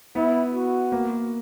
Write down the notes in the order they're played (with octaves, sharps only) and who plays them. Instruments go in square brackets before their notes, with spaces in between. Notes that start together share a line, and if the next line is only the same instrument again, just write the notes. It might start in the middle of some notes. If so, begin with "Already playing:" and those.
[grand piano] B3 [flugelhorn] E4
[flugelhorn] F#4
[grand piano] A#3